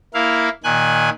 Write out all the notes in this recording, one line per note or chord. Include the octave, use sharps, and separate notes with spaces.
A#3 E4 F5
A#2 D#3 G#5 F#6